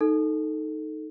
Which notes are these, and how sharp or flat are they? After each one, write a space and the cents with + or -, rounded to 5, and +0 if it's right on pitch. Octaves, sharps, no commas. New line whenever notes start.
D#4 +0 A4 +0